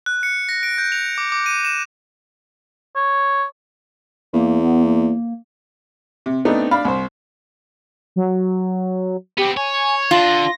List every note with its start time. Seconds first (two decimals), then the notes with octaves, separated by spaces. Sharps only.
0.06 F#6
0.23 C#7
0.49 A#6
0.63 D7
0.78 G6
0.92 F7
1.18 D6
1.32 D6
1.46 D#7
1.65 E7
2.96 C#5
4.33 E2 A#3
4.63 B3
4.84 A#3
6.26 C3
6.45 A3 B3 C4 D4 D#4
6.71 D4 F5 B5
6.85 C2 C5
8.16 F#3
9.38 B3 C4 G4
9.57 C#5 G#5
10.11 D3 D4 F4 A#6